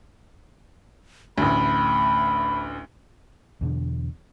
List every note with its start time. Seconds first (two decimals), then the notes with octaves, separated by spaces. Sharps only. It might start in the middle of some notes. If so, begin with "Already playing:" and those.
1.38 A1 D2 B5
3.61 E2 B2 D3